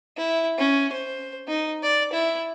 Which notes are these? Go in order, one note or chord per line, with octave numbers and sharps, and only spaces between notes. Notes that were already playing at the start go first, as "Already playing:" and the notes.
E4
C#4
C5
D#4
D5
E4